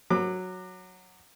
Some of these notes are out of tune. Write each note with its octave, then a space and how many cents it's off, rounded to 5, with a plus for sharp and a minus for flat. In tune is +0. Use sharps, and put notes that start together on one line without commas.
F#3 -5 D6 +25